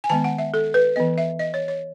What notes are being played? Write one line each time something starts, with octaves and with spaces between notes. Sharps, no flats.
G#5
D#3 G#3 B3 A5
F#5
E5
A4
B4
E3 B3 D#5
E5
D#5
C#5
C#5